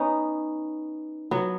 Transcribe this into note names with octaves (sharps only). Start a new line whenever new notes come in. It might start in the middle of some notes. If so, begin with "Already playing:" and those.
Already playing: B3 C#4 D#4
F#3 B3